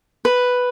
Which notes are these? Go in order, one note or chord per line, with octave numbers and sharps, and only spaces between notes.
B4